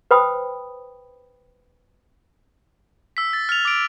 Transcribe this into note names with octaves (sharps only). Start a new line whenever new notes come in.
B4 C5 G5 B5 D#6
E6 B6
A6
F6 A6 F7
D6 F6 D7